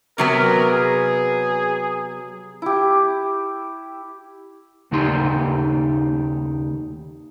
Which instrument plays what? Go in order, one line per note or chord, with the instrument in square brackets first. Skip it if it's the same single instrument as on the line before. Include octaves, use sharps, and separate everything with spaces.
[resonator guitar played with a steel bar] C3 F#3 B3 [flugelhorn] A#4
[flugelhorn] G#4
[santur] E4 G4
[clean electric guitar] D#2 C#3 A3 D#4 G4 C6